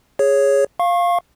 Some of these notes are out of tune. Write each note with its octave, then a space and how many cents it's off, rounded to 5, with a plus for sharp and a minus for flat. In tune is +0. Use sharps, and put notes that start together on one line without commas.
G#4 +0 C#5 +0
F5 +0 C#6 -30